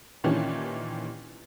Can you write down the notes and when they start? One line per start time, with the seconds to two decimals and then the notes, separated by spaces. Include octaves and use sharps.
0.24 A#2 D#3 E3 C#4 D4 G4